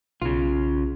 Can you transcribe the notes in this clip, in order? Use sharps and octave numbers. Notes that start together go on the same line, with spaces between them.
B1 C#3 F4